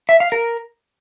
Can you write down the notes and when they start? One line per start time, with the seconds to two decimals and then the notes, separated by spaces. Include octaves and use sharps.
0.09 E5
0.20 F5
0.32 A#4